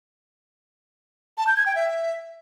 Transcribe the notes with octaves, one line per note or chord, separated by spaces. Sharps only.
A5
G6
G#6
G5
E5